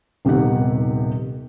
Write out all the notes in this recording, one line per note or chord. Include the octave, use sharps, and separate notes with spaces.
D#1 C3 D#3 B3 G4 F#5